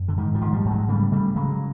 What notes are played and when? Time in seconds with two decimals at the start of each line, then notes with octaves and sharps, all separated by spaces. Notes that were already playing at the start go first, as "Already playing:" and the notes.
Already playing: F#2
0.08 D3
0.17 G#2 D#3
0.34 D#3 F3
0.41 G#2
0.52 F3 G3
0.65 G#2
0.70 F#3 G#3
0.89 C#3 G3 A3
1.12 C#3 G3 A3
1.36 C#3 F#3 G#3